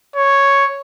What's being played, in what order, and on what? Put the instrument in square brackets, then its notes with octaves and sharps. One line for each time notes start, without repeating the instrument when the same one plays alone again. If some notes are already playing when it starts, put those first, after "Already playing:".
[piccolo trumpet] C#5